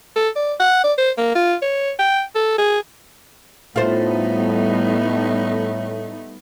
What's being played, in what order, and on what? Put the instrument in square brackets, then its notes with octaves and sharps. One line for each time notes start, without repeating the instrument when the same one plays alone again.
[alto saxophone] A4
D5
F#5
D5
C5
A#3
F4
C#5
G5
A4
G#4
[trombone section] A2 [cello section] G3 B3 D#4 [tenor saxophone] A3 [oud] F4 C5